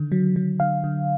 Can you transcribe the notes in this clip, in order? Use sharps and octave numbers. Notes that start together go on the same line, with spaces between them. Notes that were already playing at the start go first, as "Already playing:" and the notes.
Already playing: D3 D#3
F#3
F#3
D3 F5
D3